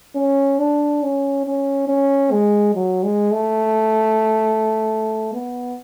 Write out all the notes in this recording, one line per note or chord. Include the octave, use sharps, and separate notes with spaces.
C#4
D4
C#4
C#4
C#4
G#3
F#3
G#3
A3
B3